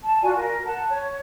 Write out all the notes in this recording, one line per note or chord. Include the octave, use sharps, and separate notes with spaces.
A5
F4 F#4 D5 G#5
A#4
F#5 A5
C#5